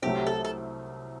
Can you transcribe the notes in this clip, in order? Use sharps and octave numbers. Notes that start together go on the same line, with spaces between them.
C2 C3 F#3 A3 C4 G4
A4
A4